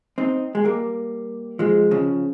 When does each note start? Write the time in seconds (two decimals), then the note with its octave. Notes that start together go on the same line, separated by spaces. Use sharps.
0.18 C4 D#4
0.55 G#3
0.65 G3 A#3
1.59 F3 G#3
1.91 C#3 F3